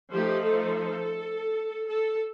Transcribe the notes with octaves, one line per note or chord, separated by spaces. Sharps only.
F3 A3 D#4 G4
A4
A4